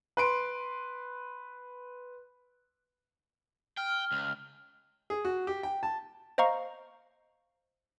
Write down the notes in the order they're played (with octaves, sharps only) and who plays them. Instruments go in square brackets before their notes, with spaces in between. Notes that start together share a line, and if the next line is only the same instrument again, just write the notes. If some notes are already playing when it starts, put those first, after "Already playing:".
[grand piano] B4 C6 D7
[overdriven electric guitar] G5 [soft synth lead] F6
[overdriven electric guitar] C#2
[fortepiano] G#4
F#4
G4
G5
A5
[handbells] C5 D#5 F5 A#5 C#6